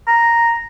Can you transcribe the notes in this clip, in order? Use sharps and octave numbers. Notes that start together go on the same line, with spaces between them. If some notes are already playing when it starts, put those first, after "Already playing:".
A#5